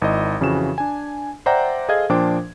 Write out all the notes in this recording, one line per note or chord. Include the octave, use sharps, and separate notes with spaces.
G#1 E4 D#5
F2 C#3 E3 F#4 E7
D4 G#5
C5 D5 E5 F#5 G5 A#5
G#4 A4 C5 D#5 F5 G#6
A#2 F3 D4 C5 G5 D6